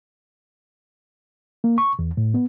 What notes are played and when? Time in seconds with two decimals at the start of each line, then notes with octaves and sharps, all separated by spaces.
1.64 A#3
1.78 C#6
1.99 E2
2.17 A2
2.34 B3